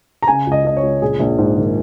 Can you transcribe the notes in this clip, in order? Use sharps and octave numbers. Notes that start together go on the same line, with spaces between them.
A#5
C#3 G#5
C#2
D#5
C#3 D#5
C#5
C#2
A#1 G#4
A#1
G#2
D#3